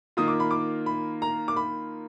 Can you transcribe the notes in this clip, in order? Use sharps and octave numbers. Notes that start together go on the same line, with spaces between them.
D#3 A#3 F4 D#6
D6
B5
D6
B5
A#5
D6
B5